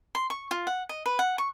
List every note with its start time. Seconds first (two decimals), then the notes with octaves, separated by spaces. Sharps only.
0.15 C6
0.30 C#6
0.51 F4
0.67 F#5
0.89 D#5
1.06 B4
1.19 F#5
1.38 C#6